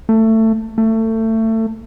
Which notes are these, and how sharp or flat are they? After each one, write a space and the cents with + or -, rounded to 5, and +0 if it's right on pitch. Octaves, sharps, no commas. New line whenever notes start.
A3 +20
A3 +25